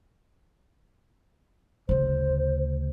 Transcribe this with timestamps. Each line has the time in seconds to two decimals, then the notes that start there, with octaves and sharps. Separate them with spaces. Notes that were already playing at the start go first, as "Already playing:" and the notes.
1.89 D2 C#3 C5